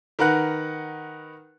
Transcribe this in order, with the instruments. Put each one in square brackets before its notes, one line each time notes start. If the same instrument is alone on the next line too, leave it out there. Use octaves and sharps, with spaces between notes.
[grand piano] D#3 A#4 B4 F#5 F#6